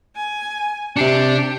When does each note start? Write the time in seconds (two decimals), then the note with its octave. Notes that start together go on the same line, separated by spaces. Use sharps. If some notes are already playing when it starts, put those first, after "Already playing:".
0.16 G#5
0.96 C3 D4 G4 C7 C#7